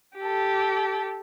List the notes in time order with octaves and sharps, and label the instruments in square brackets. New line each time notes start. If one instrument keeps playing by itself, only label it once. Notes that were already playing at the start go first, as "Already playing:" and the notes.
[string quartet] G4 A4